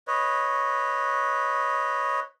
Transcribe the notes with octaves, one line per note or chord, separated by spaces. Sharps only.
B4 C#5 D#5